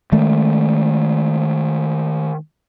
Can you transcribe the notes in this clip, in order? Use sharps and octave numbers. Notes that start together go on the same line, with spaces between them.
D#3 G#3 A3